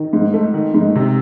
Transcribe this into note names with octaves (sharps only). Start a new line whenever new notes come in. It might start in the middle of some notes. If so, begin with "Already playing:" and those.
Already playing: D#3
G#2
A3
D#3
G#2
C3